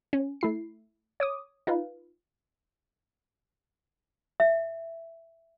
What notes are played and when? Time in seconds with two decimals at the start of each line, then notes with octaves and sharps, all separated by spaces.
0.13 C#4
0.41 A3 E4 C7
1.20 C#5 D6 D#6
1.67 D#4 F4 B4 F5
4.40 E5